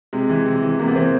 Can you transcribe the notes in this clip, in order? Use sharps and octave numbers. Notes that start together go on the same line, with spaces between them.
C3 G#3
E3
C3
E3
C3 A#3
B3
E3 C4